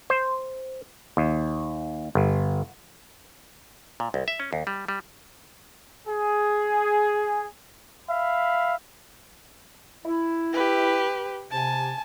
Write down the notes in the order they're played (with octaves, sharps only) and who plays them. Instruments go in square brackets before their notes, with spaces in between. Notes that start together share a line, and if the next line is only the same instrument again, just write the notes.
[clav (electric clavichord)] C5
D#2
G1
A#2
C2
E5
C#4
D#2
G3
G3
[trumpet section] G#4
E5 F5 B5
[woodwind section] E4
[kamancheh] G4 B4
[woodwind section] C3 [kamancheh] G#5 A5